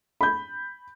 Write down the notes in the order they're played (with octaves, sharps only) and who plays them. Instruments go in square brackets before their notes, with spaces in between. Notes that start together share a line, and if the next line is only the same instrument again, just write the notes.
[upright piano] B5 G6